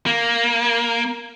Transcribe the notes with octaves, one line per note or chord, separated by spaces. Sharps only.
A#3